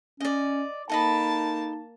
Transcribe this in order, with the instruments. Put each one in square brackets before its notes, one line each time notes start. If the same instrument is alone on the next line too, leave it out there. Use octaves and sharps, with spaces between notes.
[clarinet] C#4 [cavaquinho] D5 D#5
[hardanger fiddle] A#3 A5 [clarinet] D#4 [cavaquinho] A4 D#5 B5